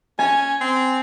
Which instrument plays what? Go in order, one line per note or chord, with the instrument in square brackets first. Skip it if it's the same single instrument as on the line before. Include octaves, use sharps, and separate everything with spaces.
[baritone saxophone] C#4 [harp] G#5
[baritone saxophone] C4